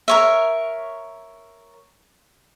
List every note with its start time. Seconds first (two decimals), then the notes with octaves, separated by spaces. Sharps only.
0.08 A#4 C#5 E5